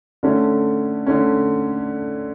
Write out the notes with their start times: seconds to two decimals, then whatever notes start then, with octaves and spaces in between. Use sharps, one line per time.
0.23 D3 A3 C#4
1.06 D3 A3 C#4